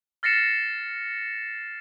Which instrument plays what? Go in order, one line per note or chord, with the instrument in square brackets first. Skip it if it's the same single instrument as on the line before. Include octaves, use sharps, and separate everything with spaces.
[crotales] F6 A6 A#6 C7 C#7 E7